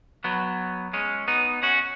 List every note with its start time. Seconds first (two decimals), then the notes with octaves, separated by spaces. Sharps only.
0.24 F#3 B3
0.93 G#3 C#4
1.28 B3 D#4
1.63 C#4 F#4